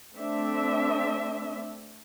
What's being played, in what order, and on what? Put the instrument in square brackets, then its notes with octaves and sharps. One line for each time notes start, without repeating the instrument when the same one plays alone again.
[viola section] A3 C4 D4 E5